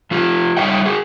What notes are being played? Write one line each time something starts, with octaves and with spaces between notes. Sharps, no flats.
F3 F4 G4
G3 D#4 C#5 E5 F5 G5
F#4 G#4